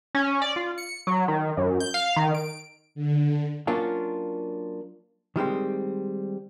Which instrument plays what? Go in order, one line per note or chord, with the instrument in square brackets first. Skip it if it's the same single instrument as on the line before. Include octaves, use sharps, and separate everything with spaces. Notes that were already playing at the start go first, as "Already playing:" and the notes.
[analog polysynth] C#4
D5
F4
C#7
F#3
D#3
F#2
G6
F5
D#3
D7
[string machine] D3
[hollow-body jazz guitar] F#3 A#3 C#4 D4 F4
D#3 G3 G#3 C4